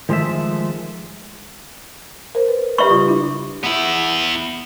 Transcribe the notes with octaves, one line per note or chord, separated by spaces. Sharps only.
D#3 F3 G#3 A3 E5
A#4 C5
B4
G4 B4 E5 C#6
C#3 G3 F4
D4 E4
B3 E4